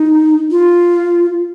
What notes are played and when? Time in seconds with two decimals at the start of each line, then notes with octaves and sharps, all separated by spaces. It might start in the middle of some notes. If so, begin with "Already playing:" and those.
Already playing: D#4
0.51 F4